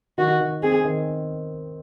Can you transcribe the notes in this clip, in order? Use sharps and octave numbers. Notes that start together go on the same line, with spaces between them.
D#3 F#4
D#3
C4 G#4
D#3